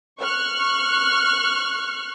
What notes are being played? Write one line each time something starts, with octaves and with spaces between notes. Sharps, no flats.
C#6 F6 F#6